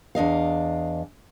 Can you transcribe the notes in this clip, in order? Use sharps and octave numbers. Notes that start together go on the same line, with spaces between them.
E2 D4 D#5 F5